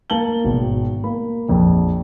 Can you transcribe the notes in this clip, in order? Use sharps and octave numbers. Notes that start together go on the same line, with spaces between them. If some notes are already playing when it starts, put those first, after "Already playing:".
A#3 A5 F#7 G7
G#1 B2
A#3 B5
A#1 F2